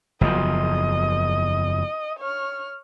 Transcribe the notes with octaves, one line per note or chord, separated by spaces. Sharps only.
F#1 E2 F3 D#5
C#5 F6